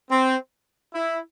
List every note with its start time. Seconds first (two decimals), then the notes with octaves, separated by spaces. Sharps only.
0.10 C4
0.93 E4